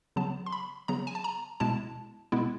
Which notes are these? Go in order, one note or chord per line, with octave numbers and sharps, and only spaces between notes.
C#3 F#3 B3 A5
C6
B5
C#3 F#3 B3 A#5
G#5
A5
A#5
B2 G#3 B3 E4 A5
B2 G#3 B3 E4